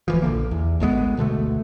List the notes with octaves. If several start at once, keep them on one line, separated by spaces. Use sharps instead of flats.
D1 E3 F3
A#1 D3 A#3
E2
G#1 D2 G#3 B3
D2 B2 D3 A3